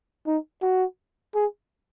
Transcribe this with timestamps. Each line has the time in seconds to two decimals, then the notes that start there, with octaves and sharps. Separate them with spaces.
0.27 D#4
0.62 F#4
1.35 G#4